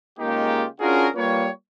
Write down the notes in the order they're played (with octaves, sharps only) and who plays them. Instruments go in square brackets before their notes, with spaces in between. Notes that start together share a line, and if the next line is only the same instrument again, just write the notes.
[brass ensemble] C#3 G#3 A#3 D#4 F4 G4
C#4 D4 F4 F#4 G#4 A#4
G3 A#3 F4 B4 C#5